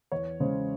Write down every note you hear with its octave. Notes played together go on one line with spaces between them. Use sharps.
E2 C#5
C#3 G#3 C#4 C5